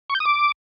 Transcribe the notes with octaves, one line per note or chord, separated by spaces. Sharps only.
C#6
G6
D#6
D6